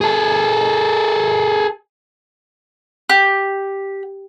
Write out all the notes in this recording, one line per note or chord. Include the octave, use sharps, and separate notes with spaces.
G#4 A4
G4